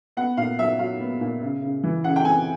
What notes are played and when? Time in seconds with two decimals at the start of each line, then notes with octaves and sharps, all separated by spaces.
0.17 B3 F#5
0.37 A#2 F5
0.59 F#3 E5
0.79 F#3 F5
1.00 B3
1.21 A#2
1.41 C#3
1.62 C#3
1.84 E3
2.04 C#3 F#5
2.16 G5
2.25 C4 G#5